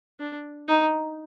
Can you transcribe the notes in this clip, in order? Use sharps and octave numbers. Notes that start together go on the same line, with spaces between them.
D4
D#4